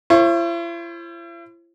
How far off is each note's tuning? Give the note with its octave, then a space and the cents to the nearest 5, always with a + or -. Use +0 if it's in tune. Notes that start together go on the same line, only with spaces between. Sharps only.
E4 +45 C5 +40 C#6 -5